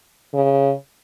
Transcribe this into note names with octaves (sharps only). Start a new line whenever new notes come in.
C#3